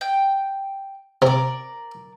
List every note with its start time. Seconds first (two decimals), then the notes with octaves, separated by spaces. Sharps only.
0.01 G5
1.22 C3 A#4 D5